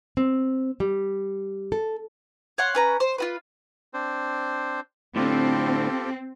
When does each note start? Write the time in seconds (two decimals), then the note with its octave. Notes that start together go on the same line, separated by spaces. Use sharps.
0.17 C4
0.80 G3
1.72 A4
2.58 C#5 F5 F#5 C6
2.75 C#4 B4 A#5
3.00 C5
3.18 F4 F#4 B4
3.94 C4 D4 C5
5.16 A2 D3 C4 F4 G4 A4